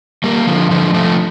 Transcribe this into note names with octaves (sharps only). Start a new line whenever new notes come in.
G3 A#3
D3 F3
D3 F3
F3 A3